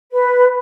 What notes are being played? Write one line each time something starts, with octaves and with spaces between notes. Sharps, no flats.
B4